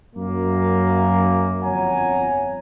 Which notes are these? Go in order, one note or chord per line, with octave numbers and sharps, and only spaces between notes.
F#2 A#3
G1 F2 C#5 F#5 G#5 A#5